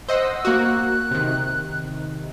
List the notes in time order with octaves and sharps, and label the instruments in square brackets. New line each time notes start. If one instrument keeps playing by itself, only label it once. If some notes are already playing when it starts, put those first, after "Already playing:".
[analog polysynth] C5 D#5 F#5 [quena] E6
[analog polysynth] A#3 F#4 [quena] F#6
[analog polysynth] C3 D#3